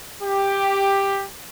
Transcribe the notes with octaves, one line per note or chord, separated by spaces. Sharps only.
G4